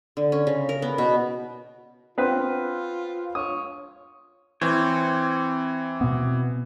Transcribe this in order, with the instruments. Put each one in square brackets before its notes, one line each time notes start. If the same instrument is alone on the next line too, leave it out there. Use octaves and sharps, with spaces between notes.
[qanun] D3
C#4
C#3
A#4
B3
B2
[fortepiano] B3 C4 B4 [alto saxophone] F4
[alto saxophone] C#5 [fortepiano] D#6
[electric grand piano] E3 [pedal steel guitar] C4 C#5
[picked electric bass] B2 B3